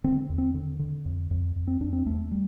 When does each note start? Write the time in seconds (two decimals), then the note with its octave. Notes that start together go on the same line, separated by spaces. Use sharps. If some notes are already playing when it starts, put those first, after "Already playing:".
0.04 D3 C4
0.30 E2
0.38 C4
0.54 D3
0.79 D3
1.05 F2
1.31 F2
1.56 F2
1.67 C4
1.80 F2 D4
1.93 C4
2.06 E2 A3
2.31 G3